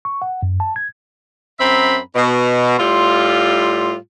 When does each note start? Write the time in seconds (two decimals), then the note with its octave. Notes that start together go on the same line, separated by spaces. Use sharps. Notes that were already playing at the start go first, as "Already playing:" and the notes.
0.05 C#6
0.22 F#5
0.43 F#2
0.60 A5
0.76 G#6
1.59 F#2 C4 E5 A#5 B5
2.14 B2
2.78 A2 G3 F4